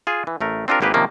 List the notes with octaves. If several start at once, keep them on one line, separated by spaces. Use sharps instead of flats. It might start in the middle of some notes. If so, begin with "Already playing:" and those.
F4 G#4
E3
A1 A3 A#4
C4 D4 F4 G4 A#4
G#1 D3 A#3 G4 G#4 B4
C3 D#3 F3 A#3 C#4 F4